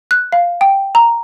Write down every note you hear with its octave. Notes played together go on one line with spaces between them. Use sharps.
F#6
F5
G5
A#5